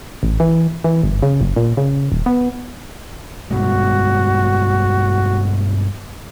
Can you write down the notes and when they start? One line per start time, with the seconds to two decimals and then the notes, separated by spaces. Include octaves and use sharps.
0.23 A1
0.40 E3
0.84 E3
1.03 G1
1.23 C#3
1.41 F#1
1.56 A#2
1.77 C#3
2.12 D#1
2.26 B3
3.51 G2 B2 G#3 F#4